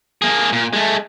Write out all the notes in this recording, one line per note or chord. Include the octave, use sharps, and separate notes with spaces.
A#3 G#4
A#2
G#3 A3